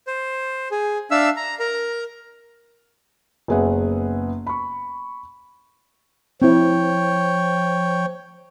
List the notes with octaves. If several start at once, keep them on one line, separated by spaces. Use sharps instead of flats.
C5
G#4
D4 E5 F5 E6
A#5
A#4 A#5
F#1 B3 G#4 B4 E5 F#5
B5 C#6
F3 C4 E4 C#5 G5